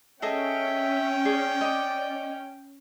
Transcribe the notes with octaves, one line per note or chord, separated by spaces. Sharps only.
C#4 G#4 A4 D#5 E5 G5
G#4 D5
D#5 D6